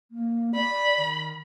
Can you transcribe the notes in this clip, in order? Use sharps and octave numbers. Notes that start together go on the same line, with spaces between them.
A#3
D5 B5
D#3